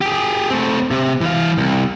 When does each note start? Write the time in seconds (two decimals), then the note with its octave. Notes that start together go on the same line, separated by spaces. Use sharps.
0.01 G4 G#4
0.50 A3 C4
0.91 C3
1.21 E3 F5
1.58 C2